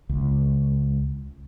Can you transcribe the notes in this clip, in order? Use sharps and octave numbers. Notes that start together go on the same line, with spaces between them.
C#2